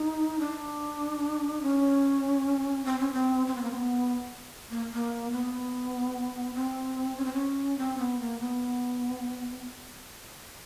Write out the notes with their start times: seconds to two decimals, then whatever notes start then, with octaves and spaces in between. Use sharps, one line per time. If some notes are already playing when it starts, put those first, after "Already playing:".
Already playing: D#4
0.39 D4
1.62 C#4
2.85 C4
2.99 C#4
3.13 C4
3.47 C4
3.55 B3
3.62 A#3
3.71 C4
3.75 B3
4.70 A#3
4.92 A#3
5.32 B3
6.55 C4
7.17 C#4
7.25 C4
7.33 C#4
7.78 C4
7.98 B3
8.20 A#3
8.40 B3